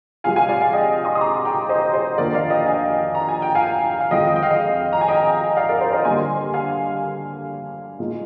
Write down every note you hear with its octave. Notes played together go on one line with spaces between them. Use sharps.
C3 F3 G#3 C4 F5 G#5
F5 G#5
D5 F5
F5 G#5
D#5 G5
C6 D#6
D#6
A#5 D6
G5 A#5
C5 D#5
C5 D#5
F2 D#3 A#3 D4 F4 A#4 D5
D5 F5
D#5 G5
F5 G#5
A#5
G#5
G5
F5 G#5
F5
F2 D#3 G#3 C4 D#5 G5
G5
F5
D#5 G5
A#5
G#5
D#5 G5
D5 F5
A#4 D5
C5
C5 D#5
D3 G3 A#3 G#5 C6
F5 G#5
A#2 G#3 D#4